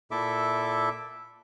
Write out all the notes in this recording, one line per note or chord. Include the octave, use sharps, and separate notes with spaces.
A#2 E4 A4 E5 D6